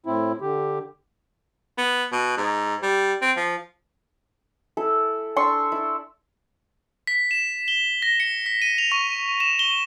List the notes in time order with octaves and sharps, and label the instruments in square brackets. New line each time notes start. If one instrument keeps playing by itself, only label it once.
[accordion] A2 C4 E4
D3 G4
[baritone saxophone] B3
B2
G#2
G3
C4
F3
[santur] E4 A4
D4 C6 C#6 E6
E4
[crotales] B6
E7
G7
A#6
C#7
B6
D#7
F7
C#6
E7
G7